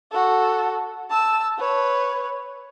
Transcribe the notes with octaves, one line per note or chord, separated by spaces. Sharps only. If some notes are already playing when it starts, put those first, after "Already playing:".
F#4 A4
A5 E6
B4 C#5